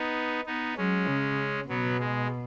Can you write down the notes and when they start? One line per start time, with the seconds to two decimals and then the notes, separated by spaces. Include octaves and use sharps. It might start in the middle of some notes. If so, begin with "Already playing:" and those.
Already playing: B3 D#4
0.46 B3 D#4
0.77 F#3 G#3 C#4
1.08 C#3
1.69 B2 F#3 B3
1.99 G#3